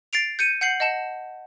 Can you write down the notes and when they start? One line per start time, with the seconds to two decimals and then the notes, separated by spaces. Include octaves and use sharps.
0.13 A6 C7 D7 F7
0.39 G6 C#7 D#7
0.61 F#5 G6 C7 F#7
0.80 D#5 F#5 A5 E7